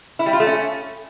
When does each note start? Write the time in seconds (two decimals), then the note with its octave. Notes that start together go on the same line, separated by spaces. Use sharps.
0.19 E4
0.26 G3
0.33 F4
0.40 A3
0.47 C#4